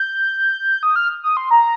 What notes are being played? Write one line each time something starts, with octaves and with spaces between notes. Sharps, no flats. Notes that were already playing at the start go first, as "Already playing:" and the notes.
Already playing: G6
D#6
F6
D#6
C6
A#5